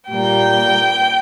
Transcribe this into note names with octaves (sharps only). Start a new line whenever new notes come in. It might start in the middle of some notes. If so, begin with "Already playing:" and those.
A#2 G3 A#3 G5